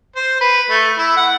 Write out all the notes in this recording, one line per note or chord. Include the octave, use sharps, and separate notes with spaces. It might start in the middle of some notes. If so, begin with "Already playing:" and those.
C5
B4
A3
E4
F#5